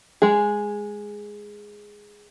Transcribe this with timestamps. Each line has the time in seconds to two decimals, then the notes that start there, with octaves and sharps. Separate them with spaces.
0.22 G#3 G#4